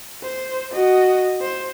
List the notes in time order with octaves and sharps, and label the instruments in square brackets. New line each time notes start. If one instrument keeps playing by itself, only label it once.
[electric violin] C5
F#4 D#5
C5